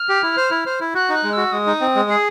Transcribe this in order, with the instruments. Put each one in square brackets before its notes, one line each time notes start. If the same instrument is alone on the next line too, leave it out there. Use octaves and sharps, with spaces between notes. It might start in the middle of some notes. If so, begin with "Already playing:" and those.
Already playing: [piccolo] F6
[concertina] G4
E4
C5
E4
C5
E4
[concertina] F#4 [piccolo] F#6
[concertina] D#4
[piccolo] F#6
[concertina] G#3
[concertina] F#4 [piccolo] E6
[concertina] G#3 [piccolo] D#6
[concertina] D#4
C4
G#3
G#4